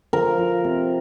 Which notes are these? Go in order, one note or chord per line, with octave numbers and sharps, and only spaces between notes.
F3 A#4
F3
C3